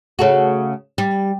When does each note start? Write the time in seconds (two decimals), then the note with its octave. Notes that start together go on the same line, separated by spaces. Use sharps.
0.19 C#3 A3 F#4
0.98 G3